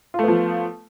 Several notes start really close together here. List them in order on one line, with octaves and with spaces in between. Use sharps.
F4 A3 B3 F3